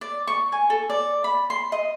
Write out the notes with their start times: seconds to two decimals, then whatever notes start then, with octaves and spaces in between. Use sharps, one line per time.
0.01 D5
0.27 C#6
0.52 G#5
0.70 A4
0.90 D5
1.24 B5
1.50 C6
1.72 D#5